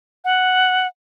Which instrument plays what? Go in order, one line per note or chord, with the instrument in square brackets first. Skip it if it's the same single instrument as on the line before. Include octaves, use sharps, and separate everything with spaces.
[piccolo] F#5